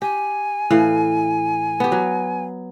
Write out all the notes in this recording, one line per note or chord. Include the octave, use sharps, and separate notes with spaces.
G4 G#5
A2 E3 F5
B3 G4
F#3